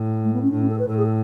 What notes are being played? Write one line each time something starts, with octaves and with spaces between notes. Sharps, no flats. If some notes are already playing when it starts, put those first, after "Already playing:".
Already playing: A2
A3
B3
C#4
A2 D4
C#4
A4
B4
A2 A4
G#4
A4